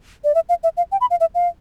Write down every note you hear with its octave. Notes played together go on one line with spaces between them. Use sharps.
D5
E5
F5
E5
F5
G5
B5
F5
E5
F5